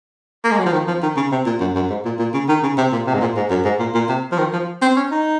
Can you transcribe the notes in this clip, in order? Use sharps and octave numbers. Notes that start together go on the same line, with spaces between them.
A#3
G#3
F#3
F3
D#3
F3
D#3
C#3
C3
A#2
F#2
F#2
G#2
A#2
A#2
C#3
D#3
C#3
C3
A#2
C3
G#2
A#2
G#2
F#2
G#2
A#2
A#2
C3
F3
D#3
F3
C4
C#4
D#4